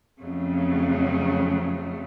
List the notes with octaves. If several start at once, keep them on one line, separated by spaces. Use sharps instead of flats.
F2 C#3 F#3 A3